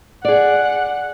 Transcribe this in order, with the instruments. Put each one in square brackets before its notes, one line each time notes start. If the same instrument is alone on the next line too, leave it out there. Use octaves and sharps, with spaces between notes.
[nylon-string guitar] G#4 D5 [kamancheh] F#5